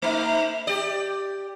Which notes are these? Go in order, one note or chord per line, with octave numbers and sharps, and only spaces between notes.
A3 D#4
G4 D5